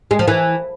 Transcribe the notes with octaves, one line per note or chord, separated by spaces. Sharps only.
G#3
F3
E3